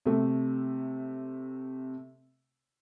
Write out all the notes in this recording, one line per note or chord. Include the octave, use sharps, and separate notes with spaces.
C3 A3